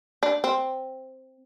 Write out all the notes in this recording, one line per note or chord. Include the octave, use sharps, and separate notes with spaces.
D4
C4